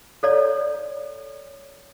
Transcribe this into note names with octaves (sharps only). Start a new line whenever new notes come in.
A4 C#5 D5